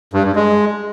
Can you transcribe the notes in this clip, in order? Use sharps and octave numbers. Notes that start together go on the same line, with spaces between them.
G2
G2
G#3